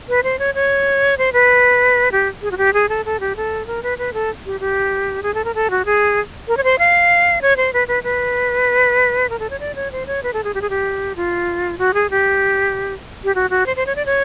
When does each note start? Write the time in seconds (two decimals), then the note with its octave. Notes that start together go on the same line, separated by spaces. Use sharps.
0.09 B4
0.23 C5
0.39 C#5
0.55 C#5
1.18 C5
1.33 B4
2.12 G4
2.42 G#4
2.51 F#4
2.58 G4
2.73 G#4
2.89 A4
3.05 A4
3.20 G4
3.36 A4
3.67 A#4
3.83 B4
3.98 B4
4.13 A4
4.46 G4
4.60 G4
5.23 G#4
5.34 A4
5.45 A#4
5.55 A4
5.70 F#4
5.85 G#4
6.48 A#4
6.57 C#5
6.64 C5
6.79 F5
7.42 C#5
7.57 C5
7.73 B4
7.88 B4
8.03 B4
9.29 A#4
9.39 A4
9.50 C#5
9.60 D5
9.75 C#5
9.92 C5
10.07 C#5
10.23 B4
10.33 A4
10.44 G#4
10.54 G4
10.62 G#4
10.70 G4
11.16 F4
11.78 F#4
11.94 G#4
12.10 G4
13.24 G4
13.35 F#4
13.50 F#4
13.66 C5
13.76 C5
13.86 C#5
13.96 D5
14.06 C#5